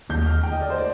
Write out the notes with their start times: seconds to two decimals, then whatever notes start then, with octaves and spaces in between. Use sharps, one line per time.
0.09 D#2 D#3 A#3 G6
0.26 F6
0.43 G5
0.52 D#5
0.61 D5
0.70 C5
0.78 D5